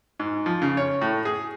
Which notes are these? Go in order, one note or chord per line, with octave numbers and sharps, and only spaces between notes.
G#2
F3
C#3
C#5
A2
G#4